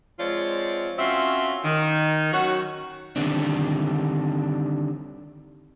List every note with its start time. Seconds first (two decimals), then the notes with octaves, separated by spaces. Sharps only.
0.19 F3 G#3 C4 F4 C#5 D5
0.98 C4 C#4 F4 F#4 E5 C6
1.64 D#3
2.33 D#3 F#3 C#4 F#4
3.16 D3 D#3 G3 C4 D4